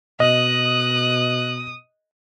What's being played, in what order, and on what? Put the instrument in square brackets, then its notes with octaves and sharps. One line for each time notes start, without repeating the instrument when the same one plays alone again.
[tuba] B2 [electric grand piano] D#5 [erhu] D#6 [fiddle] F#6